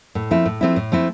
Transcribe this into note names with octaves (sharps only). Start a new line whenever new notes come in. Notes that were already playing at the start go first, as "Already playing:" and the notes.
A2
F3 A3 C4 E4
A2
F3 A3 C4 E4
A2
F3 A3 C4 E4